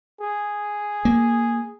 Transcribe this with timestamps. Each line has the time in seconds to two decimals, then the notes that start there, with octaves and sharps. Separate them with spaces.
0.21 G#4
1.05 A#3